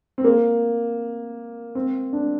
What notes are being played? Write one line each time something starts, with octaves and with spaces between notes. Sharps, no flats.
C4
A#3
C4
D4